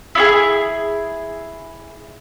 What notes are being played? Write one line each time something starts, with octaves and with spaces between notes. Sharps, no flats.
E4 F4 G#4